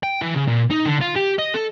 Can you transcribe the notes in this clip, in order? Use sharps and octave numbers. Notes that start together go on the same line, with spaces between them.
G5
E3
C#3
A#2
D#4
D3
F4
G4
D#5
A4